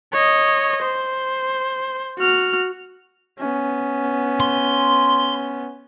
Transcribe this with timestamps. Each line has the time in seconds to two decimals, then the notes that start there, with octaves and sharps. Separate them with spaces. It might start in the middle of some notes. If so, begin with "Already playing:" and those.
0.13 C#5 D#5
0.82 C5
2.18 F#4 F6
3.38 B3 C#4
4.40 C6